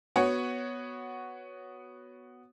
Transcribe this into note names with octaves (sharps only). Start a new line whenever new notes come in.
B3 F#4 C#5